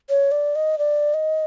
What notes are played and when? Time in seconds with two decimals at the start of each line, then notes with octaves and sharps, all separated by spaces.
0.09 C#5
0.32 D5
0.55 D#5
0.79 D5
1.14 D#5